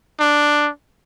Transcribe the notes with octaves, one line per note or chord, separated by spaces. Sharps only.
D4